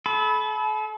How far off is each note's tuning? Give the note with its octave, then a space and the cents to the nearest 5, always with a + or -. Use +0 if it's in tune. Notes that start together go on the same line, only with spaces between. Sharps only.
A4 -40 B5 +0